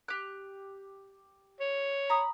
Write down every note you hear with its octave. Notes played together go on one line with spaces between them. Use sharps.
G4 F#6
C#5
A#5 B5 D#6